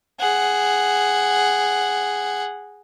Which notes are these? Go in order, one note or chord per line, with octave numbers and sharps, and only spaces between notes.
G#4 F#5